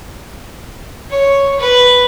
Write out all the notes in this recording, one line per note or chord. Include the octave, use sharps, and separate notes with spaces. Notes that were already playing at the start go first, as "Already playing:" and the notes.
C#5
B4